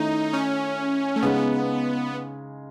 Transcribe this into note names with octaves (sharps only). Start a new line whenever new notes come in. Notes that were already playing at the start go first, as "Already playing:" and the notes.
Already playing: D#3 A3 C#4 D#4 E4
C#4
A3
C#3 G#3 B3 D#4 G#4